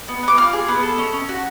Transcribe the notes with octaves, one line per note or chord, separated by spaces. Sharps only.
B3
B3 D6
F4 F6
G#4
B3
A4
C#4
C#4
F#4